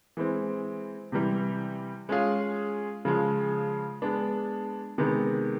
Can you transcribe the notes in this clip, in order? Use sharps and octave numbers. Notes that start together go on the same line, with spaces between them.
E3 G#3 C4
C3 E3 G3
G#3 C#4 F4 G#4
C#3 F3 G#3
G#3 B3 D4
C3 D#3 G#3 B3